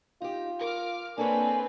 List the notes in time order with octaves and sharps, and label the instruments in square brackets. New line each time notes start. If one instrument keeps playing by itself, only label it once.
[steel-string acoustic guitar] D#4 G4 [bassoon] F4
[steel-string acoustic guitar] A#4 [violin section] D6 F6
[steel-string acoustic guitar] A#3 A4 C#5 [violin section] C4 B4 [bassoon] D4 [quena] G#5